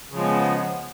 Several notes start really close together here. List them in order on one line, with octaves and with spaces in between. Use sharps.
C#3 F3 G#3 B3